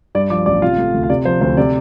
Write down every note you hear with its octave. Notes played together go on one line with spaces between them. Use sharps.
G2 D5
F3 D5 D6
A1 D5 D6
C3 F4 F5
A3
D2
F5
C3 D5
F3 C5
D2 C5
C3 D5